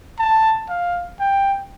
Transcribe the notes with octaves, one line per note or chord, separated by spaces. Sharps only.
A5
F5
G5